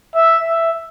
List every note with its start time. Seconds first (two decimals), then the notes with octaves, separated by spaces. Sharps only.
0.15 E5
0.47 E5